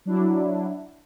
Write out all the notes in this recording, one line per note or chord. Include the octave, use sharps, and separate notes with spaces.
F#3 D4 E4